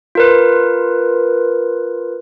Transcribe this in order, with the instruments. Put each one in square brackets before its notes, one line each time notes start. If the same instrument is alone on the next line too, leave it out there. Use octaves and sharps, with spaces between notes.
[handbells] F4 A#4 B4